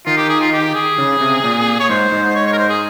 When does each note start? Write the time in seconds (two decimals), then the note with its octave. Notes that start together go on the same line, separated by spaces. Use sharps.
0.06 D#3 F4
0.17 G4
0.29 G#4
0.40 F4
0.52 G4
0.75 G#4
0.98 C#3
1.21 C3
1.44 A#2
1.80 C#5
1.89 G#2 C5
2.12 G#2
2.36 C#5
2.47 C#5
2.53 A#4
2.58 C5
2.69 G#4